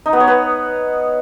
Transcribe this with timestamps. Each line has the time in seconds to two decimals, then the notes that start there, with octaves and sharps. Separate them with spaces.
0.06 D#4
0.13 B3
0.20 C#5
0.28 B4